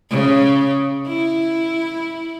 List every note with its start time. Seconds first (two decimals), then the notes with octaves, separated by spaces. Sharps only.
0.10 C#3
1.07 E4